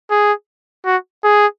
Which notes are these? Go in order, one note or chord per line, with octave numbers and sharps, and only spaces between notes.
G#4
F#4
G#4